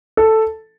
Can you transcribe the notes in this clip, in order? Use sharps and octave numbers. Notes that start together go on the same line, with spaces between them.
A4